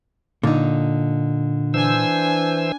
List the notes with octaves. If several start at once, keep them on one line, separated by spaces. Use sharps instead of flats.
A#2 D3 D#4
E3 D4 C5 G#5 E6